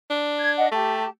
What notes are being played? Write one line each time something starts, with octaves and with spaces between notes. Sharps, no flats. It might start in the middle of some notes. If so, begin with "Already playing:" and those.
D4
G#6
D#5 F#5
A3 G4 A5